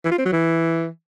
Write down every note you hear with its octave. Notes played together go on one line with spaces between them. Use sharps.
E3
F4
C4
F#3
E3